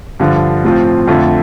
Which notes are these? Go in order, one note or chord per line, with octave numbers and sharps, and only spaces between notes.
G2 D3 F3
A2 F3 C4 F4
F2 D3 A3 F4